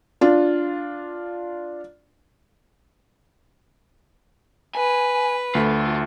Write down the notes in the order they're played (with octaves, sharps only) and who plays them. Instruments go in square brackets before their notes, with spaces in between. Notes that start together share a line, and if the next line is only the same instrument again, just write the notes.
[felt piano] D4 F4
[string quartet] B4 [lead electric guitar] G#5
[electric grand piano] D2 A3 [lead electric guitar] F4